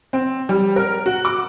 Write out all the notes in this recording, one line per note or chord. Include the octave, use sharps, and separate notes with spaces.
C4
G3
A#4
F#4
D6